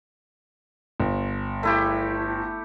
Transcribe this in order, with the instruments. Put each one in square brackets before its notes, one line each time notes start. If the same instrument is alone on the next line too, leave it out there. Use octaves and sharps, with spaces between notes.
[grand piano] G1
[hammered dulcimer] A3 E4 G4